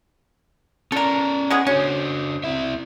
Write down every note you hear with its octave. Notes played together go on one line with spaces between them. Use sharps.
C#4 A4 A#4 D5
G#3 B3 G#4
C#4 D4 F#4 C5
C4 E4 E5